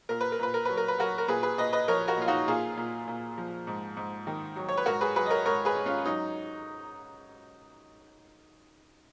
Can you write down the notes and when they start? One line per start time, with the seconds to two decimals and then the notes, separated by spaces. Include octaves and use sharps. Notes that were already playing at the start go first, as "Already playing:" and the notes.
0.09 A#2 A#4
0.21 B4
0.32 A#4
0.39 A#2 B4
0.54 A#4
0.65 F#3 B4
0.77 A#4
0.88 B4
0.98 F#3 F#4 A#4
1.18 A#4
1.28 A#2 G#4 B4
1.43 G#4 B4
1.58 A#2 B4 D#5
1.73 B4 D#5
1.88 F3 A#4 C#5
2.08 F#4 A#4
2.17 A#2 F4
2.28 D#4 F#4
2.48 A#2 F4 G#4
2.77 A#2
3.07 A#2
3.38 F3
3.67 G#2
3.97 G#2
4.27 D#3
4.56 F#3
4.69 C#5
4.77 B4
4.86 G#2 F#4 A#4
5.01 G#4 B4
5.16 F#3 G#4 B4
5.26 D#5
5.30 A#4 C#5
5.46 G#2 A#4 C#5
5.65 G#4 B4
5.76 G#2
5.85 C#4 F4
6.05 F#3 D#4